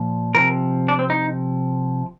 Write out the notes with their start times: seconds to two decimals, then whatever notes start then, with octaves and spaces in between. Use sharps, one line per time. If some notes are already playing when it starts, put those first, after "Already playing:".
Already playing: A#2 F3
0.35 C3 F3 A#4
0.88 D4
0.99 C4
1.10 D#4